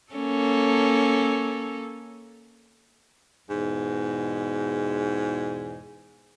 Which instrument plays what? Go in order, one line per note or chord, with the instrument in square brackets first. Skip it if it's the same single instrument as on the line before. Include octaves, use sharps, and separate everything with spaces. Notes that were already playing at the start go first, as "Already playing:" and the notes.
[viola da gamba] A#3 C#4 A4
[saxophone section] E2 G#2 B2